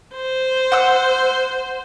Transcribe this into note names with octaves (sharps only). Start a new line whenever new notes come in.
C5
F#5 E6